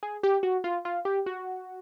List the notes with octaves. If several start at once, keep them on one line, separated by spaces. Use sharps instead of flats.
G#4
G4
F#4
F4
F4
G4
F#4